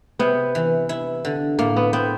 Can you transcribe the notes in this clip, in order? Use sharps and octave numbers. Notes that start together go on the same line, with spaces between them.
C3 B3
E3
E4
D3
A2 A#3
B3
B3 C4